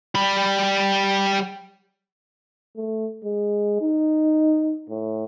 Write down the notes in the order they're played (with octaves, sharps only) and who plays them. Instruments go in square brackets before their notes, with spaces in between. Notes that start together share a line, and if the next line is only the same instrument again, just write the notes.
[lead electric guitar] G3 B5
[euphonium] A3
G#3
D#4
A2